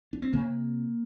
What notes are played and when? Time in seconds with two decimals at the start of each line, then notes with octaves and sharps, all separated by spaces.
0.13 D4
0.22 C4
0.33 C3 A#3